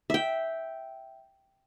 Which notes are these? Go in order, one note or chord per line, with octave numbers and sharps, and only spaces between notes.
E5 G5